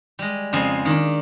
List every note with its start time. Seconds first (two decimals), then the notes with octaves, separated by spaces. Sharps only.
0.19 G3 G#3
0.53 F2 C#3 F3 G#3 G#4
0.85 D#3 D4